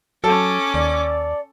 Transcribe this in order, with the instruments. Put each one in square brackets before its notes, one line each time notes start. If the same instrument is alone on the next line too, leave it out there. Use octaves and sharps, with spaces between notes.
[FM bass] F#3 [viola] C#4 D6 [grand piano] A4
[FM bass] D#2 [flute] D5